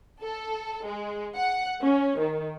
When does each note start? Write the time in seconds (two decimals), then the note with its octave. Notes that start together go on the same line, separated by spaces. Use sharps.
0.22 A4
0.85 G#3
1.35 F#5
1.83 C#4
2.20 D#3